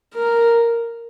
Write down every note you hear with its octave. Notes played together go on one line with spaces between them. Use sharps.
A#4